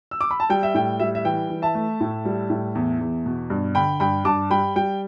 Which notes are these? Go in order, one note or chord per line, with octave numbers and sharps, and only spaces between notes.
E6
D6
B5
A5
G3 G5
E5
A2 G5
G3 E5
E5
E3 G5
E3
E5 A5
A3
A2
G3
A2
E2
E2
B2
G2
D3 G5 B5
G2 G5 B5
G2 A5 D6
G3 G5 B5
G3 G5